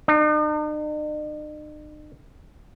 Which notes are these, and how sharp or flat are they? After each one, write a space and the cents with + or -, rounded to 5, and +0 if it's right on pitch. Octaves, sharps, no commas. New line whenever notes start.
D#4 -45